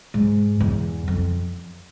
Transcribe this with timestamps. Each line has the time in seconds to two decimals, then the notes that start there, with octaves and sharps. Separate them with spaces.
0.14 G#2
0.60 E2
1.08 F2